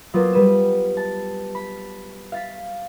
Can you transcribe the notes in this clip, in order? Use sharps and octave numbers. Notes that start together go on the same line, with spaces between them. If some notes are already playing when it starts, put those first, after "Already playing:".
F#3 A#3 B3 F4 C5
G3 B4 D#7 E7
A5
B5
F5 A6 B6